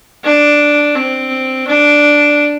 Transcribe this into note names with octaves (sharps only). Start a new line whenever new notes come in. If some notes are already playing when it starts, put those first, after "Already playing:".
D4
C4
D4